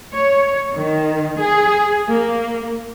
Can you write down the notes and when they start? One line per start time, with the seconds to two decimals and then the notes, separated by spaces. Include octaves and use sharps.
0.14 C#5
0.73 D#3
1.39 G#4
2.10 A#3